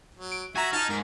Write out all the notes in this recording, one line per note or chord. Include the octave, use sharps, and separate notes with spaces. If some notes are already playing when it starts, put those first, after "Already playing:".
F#3
D7
F#4 E5 G#5 A#5
D#4 A5 F6
G#2 A#4